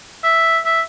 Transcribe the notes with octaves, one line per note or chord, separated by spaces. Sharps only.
E5
E5